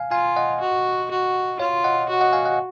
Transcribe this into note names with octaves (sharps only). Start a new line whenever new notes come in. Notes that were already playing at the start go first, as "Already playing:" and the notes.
Already playing: F5 G#5
F4 F5 G#5
D#5 F#5
F#4
F#4
F4 C#5 F5
D#5 F#5
F#4
D#5 F#5
F5 G#5
D#5 F#5